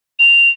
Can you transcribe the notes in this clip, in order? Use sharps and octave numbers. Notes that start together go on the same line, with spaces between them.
F7